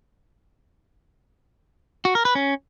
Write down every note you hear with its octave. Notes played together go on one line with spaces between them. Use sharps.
F#4
A#4
B4
C#4